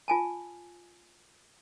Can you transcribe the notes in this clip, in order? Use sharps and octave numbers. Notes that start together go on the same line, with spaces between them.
F4 G#5 A5